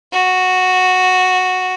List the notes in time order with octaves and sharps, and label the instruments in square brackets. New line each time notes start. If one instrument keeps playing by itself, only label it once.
[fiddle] F#4